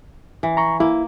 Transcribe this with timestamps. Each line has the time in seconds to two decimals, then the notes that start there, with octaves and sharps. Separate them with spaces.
0.43 E3
0.57 A#5 C#6
0.80 A#3 E4